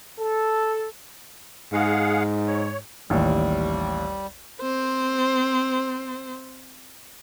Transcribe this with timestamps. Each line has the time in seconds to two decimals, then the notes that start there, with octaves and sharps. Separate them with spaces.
0.19 A4
1.73 G#2 G#4 F5 F#5
2.47 C#5
3.10 A1 D#2 G3
4.62 C4 C5